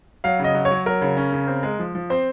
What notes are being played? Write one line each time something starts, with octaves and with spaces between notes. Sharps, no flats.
F#3 F5
C#3 D#5
F#3
C#5
F#3
F#3 A#4
C#3
C#4
C#3
C4
G#3
F3
F3
C4 C5